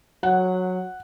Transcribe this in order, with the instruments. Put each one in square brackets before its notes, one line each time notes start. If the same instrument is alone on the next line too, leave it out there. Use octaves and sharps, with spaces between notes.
[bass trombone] F#3 [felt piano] F#5